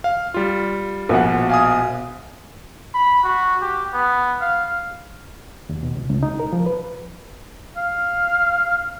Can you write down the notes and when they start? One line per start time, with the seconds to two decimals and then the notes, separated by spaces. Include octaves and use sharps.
0.04 F5
0.34 G3 F4
1.09 A#1 B2 F#5
1.50 F5 G#5 D#6
2.94 B5
3.23 F#4
3.62 G4
3.93 B3
4.41 F5
5.69 D#2
5.83 B2
5.95 C#2
6.10 C#2
6.23 D#4
6.40 A#4
6.53 F3
6.66 B4
7.76 F5